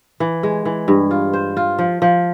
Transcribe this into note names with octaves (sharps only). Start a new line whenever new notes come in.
E3
G#3
E3
G2
F4
C5
F4
F3
F3